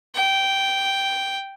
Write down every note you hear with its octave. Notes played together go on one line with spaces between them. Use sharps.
G5